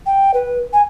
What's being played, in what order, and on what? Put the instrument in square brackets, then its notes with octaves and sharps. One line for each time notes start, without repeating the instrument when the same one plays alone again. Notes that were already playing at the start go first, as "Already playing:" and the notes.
[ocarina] G5
B4
G#5